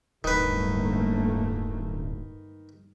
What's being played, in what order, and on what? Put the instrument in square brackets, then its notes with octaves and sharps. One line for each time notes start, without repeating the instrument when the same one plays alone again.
[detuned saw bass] D1 [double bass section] G1 A3 A#3 [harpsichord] D#3 B4